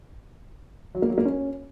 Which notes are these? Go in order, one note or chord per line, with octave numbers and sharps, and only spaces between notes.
F#3
A#3
F#3
A#3
C#4